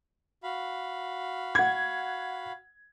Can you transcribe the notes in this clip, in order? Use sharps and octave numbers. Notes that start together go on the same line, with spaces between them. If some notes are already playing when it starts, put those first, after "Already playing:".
F#4 F5 B5
F#5 G#6